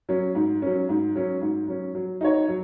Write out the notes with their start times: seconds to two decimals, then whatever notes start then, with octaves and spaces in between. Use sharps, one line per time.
0.09 F#3 C#4
0.35 G#2
0.62 F#3 C#4
0.89 G#2
1.15 F#3 C#4
1.42 G#2
1.68 F#3 C#4
1.95 F#3
2.21 D#4 F#4 C#5
2.48 F#3